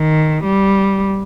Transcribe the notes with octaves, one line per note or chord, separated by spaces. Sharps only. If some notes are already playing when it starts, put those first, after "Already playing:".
Already playing: D#3
G3